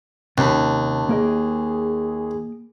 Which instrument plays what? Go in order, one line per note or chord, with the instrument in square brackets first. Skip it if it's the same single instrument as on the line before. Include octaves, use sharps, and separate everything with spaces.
[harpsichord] D#2 [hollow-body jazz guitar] C3 C#4 B5 [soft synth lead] A5
[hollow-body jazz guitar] A#3 A#4 D#5 [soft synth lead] G#4